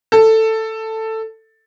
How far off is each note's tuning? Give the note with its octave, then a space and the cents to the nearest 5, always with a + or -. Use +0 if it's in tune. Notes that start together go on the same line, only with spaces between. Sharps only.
A4 +10